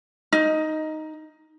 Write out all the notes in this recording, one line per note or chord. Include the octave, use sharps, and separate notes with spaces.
D#4